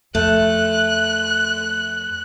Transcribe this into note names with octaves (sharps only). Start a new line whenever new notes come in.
F2 A3 F#6